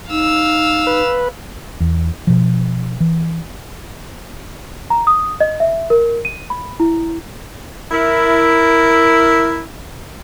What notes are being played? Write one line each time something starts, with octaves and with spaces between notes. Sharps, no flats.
D#4 F5 E6
B4
E2
B2 F3
E3
A#5
D#6
D#5
E5
A#4
D#7
B5
E4
E4 A#4